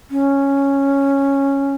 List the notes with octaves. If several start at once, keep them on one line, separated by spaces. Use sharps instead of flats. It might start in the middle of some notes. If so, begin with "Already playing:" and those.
C#4